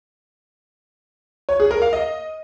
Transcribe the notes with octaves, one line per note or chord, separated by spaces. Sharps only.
C#5
G#4
A#4
F5
D#5